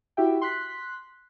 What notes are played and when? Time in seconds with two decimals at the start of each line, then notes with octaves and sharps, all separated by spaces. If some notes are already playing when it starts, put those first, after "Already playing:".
0.17 E4 F#4 G4 E5 G5
0.42 C6 F#6 B6